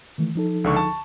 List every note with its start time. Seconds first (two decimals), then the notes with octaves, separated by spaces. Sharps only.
0.18 D#3 E3 A3
0.35 F3 D#4 A4
0.64 C#2 D3 C#6
0.76 A5 C#6